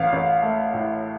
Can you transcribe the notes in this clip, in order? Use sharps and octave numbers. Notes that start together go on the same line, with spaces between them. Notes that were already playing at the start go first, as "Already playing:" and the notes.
Already playing: A1 F5
A1
A3
A2